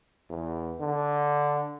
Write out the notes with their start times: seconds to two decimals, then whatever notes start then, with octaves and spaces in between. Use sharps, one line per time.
0.30 E2
0.80 D3